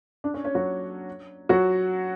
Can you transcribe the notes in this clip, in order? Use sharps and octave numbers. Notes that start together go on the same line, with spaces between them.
D4 D5
C#4 C#5
C#4 C#5
F#3 F#4
F#3 F#4